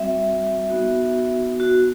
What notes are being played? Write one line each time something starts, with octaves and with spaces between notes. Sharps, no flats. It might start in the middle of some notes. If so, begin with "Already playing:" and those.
Already playing: G3 C4 F#4 E5
B3 D#4 F#4
F#4